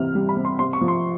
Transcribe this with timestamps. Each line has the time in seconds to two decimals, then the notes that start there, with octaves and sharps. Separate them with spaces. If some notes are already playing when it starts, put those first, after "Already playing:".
Already playing: C3 E3 F6
0.15 G3
0.29 B5
0.37 C3
0.45 C6
0.59 C3 C6
0.73 C#6
0.81 F3
0.88 C6